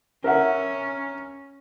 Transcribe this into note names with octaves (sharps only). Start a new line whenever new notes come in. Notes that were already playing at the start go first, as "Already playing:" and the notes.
C#4 A#4 E5 F#5